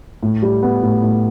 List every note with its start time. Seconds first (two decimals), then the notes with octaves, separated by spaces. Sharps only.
0.23 A2
0.42 G3
0.62 B3
0.83 A2
1.03 A2